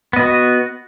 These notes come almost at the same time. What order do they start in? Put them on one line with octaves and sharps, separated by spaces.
B3 D#5 F#4